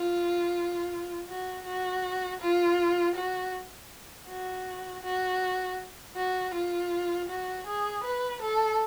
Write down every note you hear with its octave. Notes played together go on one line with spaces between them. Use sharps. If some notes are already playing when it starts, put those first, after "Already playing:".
Already playing: F4
F#4
F#4
F4
F#4
F#4
F#4
F#4
F4
F#4
G#4
B4
A4